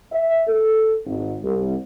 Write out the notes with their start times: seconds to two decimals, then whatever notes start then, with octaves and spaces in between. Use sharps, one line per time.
0.12 E5
0.48 A4
1.05 G#1
1.43 C2